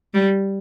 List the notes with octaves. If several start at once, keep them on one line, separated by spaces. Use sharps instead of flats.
G3